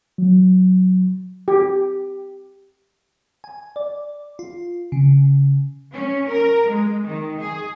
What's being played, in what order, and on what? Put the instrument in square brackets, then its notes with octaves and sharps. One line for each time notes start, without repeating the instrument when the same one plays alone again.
[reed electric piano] F#3
[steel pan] G4
[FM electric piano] G#5
D5
F4
C#3
[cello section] C#4
A#4
G#3
D#3
G#4